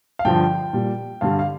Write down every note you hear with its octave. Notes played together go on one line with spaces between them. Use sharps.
F5
G2 D3 F3 G5
A#2 G3
G2 D3 G3 F5
F5